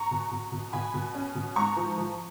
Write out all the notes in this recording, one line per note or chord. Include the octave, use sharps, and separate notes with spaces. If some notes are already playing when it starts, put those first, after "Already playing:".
Already playing: A#5 C#6
B2
B2
B2
B2 G#5 B5
B2
C#4
B2
G#2 A#5 C#6
F3
F3